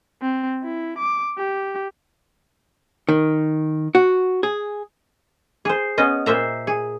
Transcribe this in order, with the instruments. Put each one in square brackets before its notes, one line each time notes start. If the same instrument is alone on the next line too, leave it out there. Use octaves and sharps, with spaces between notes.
[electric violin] C4
E4
D6
G4
[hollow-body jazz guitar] D#3
F#4
G#4
[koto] G#4 C5
B3 C#4 D#5
A#2 C5 E5 A#5
G#4